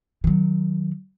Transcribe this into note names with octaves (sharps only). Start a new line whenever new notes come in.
D#3 F#3